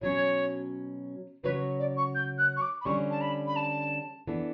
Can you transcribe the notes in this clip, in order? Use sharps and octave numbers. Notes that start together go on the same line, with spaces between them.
B2 F#3 C#4 C#5
C#3 F#3 C#4 F#4 B4 C#5
D5
C#6
G6
F#6
C#6
D6
B5
D3 G3 C#4 C#6
A5
B5
B5
A5
E3 B3 D4 A4